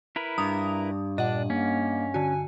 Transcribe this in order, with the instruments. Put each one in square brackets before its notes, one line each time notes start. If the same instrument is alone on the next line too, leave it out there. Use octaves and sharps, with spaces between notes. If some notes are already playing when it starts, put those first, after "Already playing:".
[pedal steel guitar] E4 A#4 B4
[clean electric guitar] G2 [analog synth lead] A#5 [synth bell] D#6
[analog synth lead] A#2 [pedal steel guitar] D4 [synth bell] D#5 F#5
[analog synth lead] A#3 [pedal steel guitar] C#4
[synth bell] D3 F#4 [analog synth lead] G#5